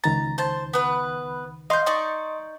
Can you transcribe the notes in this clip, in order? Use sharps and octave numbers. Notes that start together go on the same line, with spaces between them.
C#2 D#3 A#5 A6
C5 A5
B3 B4
D#5 F5 C6 G6
D#4 D5 C#6